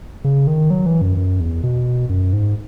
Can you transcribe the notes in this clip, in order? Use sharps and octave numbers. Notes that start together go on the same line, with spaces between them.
C#3
D#3
F#3
E3
F#2
F#2
E2
B2
F#2
G#2